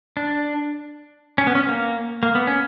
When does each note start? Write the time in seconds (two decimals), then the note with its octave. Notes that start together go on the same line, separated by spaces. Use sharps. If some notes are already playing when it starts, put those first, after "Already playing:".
0.17 D4
1.38 C#4
1.47 B3
1.55 C#4
1.69 A#3
2.23 A#3
2.35 B3
2.47 C#4